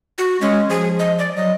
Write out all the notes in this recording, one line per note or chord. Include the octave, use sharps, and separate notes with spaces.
F#4
G#3 C#4
F3 G#4
D#5
D5
F#3 D#5